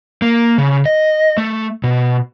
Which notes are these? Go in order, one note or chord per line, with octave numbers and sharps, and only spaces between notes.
A#3
C#3
D#5
A3
B2